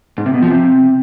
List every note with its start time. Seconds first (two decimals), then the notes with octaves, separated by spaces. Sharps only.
0.18 G#2
0.26 C3
0.34 B2
0.42 F3
0.50 C3